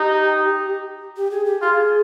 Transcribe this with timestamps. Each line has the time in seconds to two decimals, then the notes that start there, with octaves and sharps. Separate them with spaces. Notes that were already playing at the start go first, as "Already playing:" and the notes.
Already playing: D#4 G4
1.17 G4
1.31 G#4
1.46 G4
1.61 F4 G#4